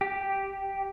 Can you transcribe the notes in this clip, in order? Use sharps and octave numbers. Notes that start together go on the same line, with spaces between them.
G4